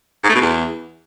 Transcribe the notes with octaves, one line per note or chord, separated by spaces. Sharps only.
G#2
A3
B2
E2